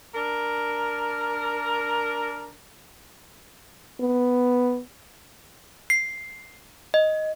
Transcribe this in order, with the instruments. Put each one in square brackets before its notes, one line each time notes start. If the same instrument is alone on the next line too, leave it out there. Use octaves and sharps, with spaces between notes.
[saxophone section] D4 A#4
[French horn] B3
[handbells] C7
D#5